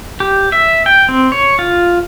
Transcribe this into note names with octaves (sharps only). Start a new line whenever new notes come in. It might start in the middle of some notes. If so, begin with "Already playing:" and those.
G4
E5
G5
C4
C#5
F4